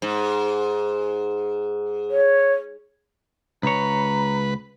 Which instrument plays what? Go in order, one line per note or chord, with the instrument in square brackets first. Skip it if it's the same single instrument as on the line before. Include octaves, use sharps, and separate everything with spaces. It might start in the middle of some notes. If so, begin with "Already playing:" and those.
[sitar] G#2
[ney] C#5
[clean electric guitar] C#2 C#5 [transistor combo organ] B4 [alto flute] A#5